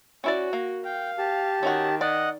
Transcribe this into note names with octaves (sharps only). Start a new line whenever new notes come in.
C#4 E4 F#4 D5
A#3
F5 G5
G4 A5
D#3 C#4 D#4 F#4
D5 D#5 F#5